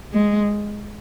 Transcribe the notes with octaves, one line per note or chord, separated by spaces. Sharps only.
G#3